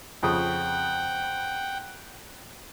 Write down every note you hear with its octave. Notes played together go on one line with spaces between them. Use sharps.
F2 C#3 F#5 G5 D#6